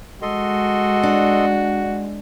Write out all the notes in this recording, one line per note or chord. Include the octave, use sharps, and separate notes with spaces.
G#3 F#4 A4 D#5 C6
D4